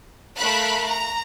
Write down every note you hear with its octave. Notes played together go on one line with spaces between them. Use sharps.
A3 A#4 F5 B5 F#6
A#5